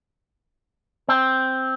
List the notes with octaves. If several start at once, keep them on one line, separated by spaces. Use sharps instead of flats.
C4